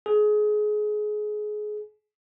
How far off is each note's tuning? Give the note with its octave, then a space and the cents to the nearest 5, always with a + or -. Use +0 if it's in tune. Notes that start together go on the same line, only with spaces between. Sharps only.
G#4 +25